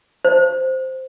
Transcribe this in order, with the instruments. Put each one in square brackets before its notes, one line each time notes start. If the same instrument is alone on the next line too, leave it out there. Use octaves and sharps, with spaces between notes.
[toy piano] C5